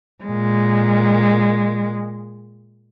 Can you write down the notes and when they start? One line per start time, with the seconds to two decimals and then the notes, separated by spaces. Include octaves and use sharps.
0.24 A#2 G#3